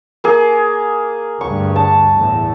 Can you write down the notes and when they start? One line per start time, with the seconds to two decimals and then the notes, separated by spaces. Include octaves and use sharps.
0.24 A#3 G#4
1.41 D2 G2 C#6
1.76 A5
2.15 E2 A2